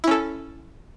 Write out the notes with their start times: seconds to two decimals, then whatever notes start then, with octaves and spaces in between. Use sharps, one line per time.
0.04 E4
0.07 C#4
0.11 A4